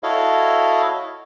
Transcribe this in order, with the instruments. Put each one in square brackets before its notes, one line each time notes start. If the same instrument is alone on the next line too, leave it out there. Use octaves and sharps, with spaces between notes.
[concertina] E4 F#4 A4 C#5 D#5 F5